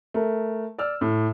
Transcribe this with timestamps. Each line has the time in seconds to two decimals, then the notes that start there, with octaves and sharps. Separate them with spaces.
0.14 A3 A#4
0.78 D5 E6 F6
1.01 A2